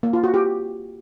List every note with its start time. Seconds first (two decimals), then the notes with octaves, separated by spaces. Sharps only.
0.03 A#3
0.13 F4
0.24 F#4
0.34 G4